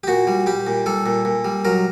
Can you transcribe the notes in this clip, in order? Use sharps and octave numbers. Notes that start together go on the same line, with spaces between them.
G4
A#2 F#4
G3
G3 G4
A#2
G3 A4
A#2
A#2
G3
F#3 A#4